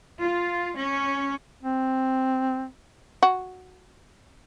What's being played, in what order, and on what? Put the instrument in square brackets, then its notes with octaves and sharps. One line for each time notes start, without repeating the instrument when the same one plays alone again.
[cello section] F4
C#4
[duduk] C4
[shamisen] F#4